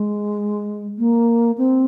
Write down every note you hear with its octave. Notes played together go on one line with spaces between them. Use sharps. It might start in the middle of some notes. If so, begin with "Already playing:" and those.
Already playing: G#3
A#3
C4